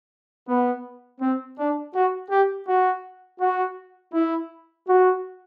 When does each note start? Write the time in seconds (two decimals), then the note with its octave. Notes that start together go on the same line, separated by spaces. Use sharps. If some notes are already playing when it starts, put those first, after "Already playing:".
0.48 B3
1.21 C4
1.58 D4
1.95 F#4
2.30 G4
2.68 F#4
3.41 F#4
4.14 E4
4.88 F#4